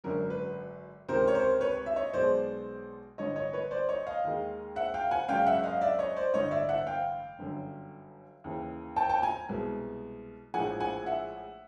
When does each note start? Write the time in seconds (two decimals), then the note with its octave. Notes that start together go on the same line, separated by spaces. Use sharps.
0.04 G#1 F#2 D3 F#3 A#4
0.30 B4
1.08 C#2 C3 D#3 A#4 C5
1.28 C#5
1.35 A#4 C5
1.61 B4 C#5
1.86 E5
1.96 C#5 D#5
2.13 B1 B2 G#3 C5 D5
3.18 A1 G2 D3 C#5 D#5
3.36 C#5 D#5
3.53 B4 C#5
3.71 C5 D5
3.89 C#5 D#5
4.07 D#5 F5
4.24 D#2 D#3 G#3
4.76 E5 F#5
4.94 F5 G5
5.11 F#5 G#5
5.29 G#1 F#2 C#3 F5 G5
5.46 E5 F#5
5.63 D#5 F5
5.81 D5 E5
5.99 C#5 D#5
6.16 C5 D5
6.34 A1 G2 D3 C#5 D#5
6.51 D5 E5
6.69 E5 F#5
6.86 F5 G5
7.39 G1 F#2 D3 F#3
8.44 D#2 C#3 E3
8.96 G5 A5
9.09 G5 A5
9.22 G#5 A#5
9.49 C2 B2 G#3
10.54 A#1 A2 F3 G#3 F#5 G#5
10.80 F#5 G#5
11.06 E5 F#5